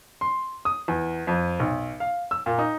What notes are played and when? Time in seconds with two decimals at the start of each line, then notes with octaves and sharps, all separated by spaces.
0.21 C6
0.65 D#6
0.88 E2
1.27 F2
1.60 B1
2.00 F5
2.31 E6
2.46 A#2
2.59 D#4